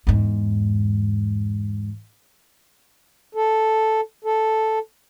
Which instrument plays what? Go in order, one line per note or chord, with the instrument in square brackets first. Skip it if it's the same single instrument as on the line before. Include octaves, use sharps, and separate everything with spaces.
[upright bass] E2 G#2
[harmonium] A4
A4